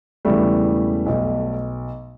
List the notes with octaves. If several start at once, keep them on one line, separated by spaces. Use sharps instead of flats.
E1 E2 C#3 E3 G3 A3
B1 B2